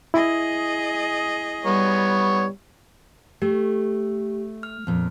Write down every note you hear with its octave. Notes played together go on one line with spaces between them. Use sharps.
E4 G#4 D#5
G3 B3 C#5
A3 G4
F6
F2 A#2